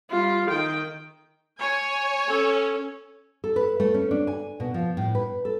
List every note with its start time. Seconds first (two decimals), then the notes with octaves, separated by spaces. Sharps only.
0.11 G3 F4
0.49 D#3 G5
1.60 C#5 G#5
2.27 C#4 A4
3.44 A4
3.56 B4
3.80 A3
3.94 C#4
4.11 D4
4.27 G#5
4.60 B2
4.74 F3
4.97 A2
5.15 B4
5.45 A4